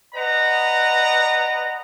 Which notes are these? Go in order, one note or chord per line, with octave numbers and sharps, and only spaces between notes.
B4 D5 D#5 F#5 A#5